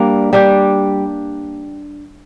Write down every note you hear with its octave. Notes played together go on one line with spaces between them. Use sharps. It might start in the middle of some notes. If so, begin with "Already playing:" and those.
Already playing: G3 A#3 D4
G3 D4 G4